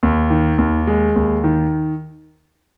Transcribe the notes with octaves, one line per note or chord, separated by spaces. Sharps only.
D#2
D#3
D#2
G#3
D#2
D#3